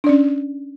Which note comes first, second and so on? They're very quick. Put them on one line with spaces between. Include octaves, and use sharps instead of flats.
D4 D5 C#4